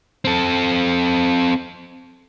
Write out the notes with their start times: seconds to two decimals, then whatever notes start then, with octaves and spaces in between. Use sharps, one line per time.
0.25 C4 A4